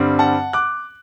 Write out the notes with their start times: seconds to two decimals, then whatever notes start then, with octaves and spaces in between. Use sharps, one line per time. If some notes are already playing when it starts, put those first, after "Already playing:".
Already playing: G2 D3 G3 C4
0.19 F#5 A5
0.53 D6 F#6